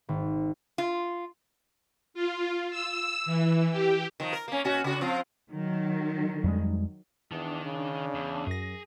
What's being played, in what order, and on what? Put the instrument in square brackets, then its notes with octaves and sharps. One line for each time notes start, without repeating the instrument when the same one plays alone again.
[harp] G#1
[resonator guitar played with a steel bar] F4
[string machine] F4
E6
E3
G4
[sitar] D#3 F3
A#4
A#3 C#4
A#2 C#4 F#4
C#3 F#4
F3 C4 F4
[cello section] D#3 F#3
[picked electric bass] F2 G3 G#3
[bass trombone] E2 [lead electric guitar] D#3 [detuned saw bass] D4
[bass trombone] C#3
[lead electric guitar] E2
[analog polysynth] F#2 A#6 [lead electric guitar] G#4